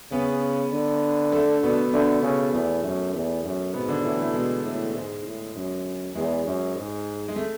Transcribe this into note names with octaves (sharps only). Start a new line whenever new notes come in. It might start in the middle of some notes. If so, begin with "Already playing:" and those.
C#3 B3 B4
D3
A3 A4
B2 B3
D3 A3
C#3
E2 A3
F#2
E2
F#2
G#2 B2 B3
D3 D4
A2 E3 E4
A3
B2 G#3
A2
G#2
A2
F#2
E2 G#3
F#2
G#2
G#3
A3